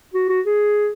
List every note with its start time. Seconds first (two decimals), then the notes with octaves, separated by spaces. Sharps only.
0.14 F#4
0.29 F#4
0.46 G#4